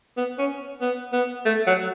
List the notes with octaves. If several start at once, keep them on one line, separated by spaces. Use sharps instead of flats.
B3
C#4
B3
B3
A3
F#3